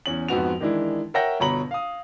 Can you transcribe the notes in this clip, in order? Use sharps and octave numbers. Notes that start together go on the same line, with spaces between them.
E2 C#4 F#7
F2 G#2 B3 F#4 F7
D#3 E3 G#3 D4 E4
A#4 C#5 E5 F#5 G5 A#6
G1 B2 C#5 A#5 B5 F#7
F5 D#6